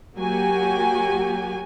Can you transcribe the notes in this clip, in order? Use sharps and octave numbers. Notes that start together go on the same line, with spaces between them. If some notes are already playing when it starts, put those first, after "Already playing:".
F#3 A#3 F#4 G4 G#5